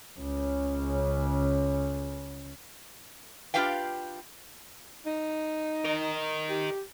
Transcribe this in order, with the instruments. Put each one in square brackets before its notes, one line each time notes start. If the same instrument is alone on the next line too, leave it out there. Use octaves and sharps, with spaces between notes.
[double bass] C#2 C#3
[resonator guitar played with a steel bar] D4 F4 G4 B4 F5 G5
[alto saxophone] D#4
[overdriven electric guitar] A#4 D#5
[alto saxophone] G4